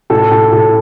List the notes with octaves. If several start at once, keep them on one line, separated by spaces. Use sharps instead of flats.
A2 A4
A2
A2 A4